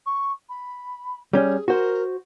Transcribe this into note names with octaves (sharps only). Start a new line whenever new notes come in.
C#6
B5
G3 C#4 G#4
F#4 A#4 C5